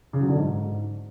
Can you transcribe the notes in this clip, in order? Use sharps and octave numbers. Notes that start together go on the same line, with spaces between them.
C#3
F#3
D3
G#2